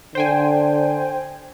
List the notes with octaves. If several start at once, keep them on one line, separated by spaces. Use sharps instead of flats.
D3 C5 G5 G#5